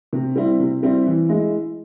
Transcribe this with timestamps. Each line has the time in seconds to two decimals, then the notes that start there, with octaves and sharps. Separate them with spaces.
0.13 C3
0.36 G3 C4 E4
0.59 C3
0.83 G3 C4 E4
1.06 E3
1.29 G#3 E4